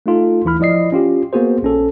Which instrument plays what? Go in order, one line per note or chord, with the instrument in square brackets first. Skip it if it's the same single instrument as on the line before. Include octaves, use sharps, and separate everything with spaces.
[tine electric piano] A3 D#4 F4 A4
D#2 E3 E4 B5 F6
F3 E4 D5 D#5 C7
C#4 F4 G4
A#3 B3 F#4 G#4 C5
A#1 C#4 A4